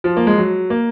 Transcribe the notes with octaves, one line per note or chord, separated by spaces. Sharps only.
F3
A#3
G#3
F#3
A#3